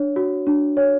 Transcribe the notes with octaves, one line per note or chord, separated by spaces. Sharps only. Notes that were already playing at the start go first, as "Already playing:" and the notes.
Already playing: D4 C#5
F#4
D4
C#5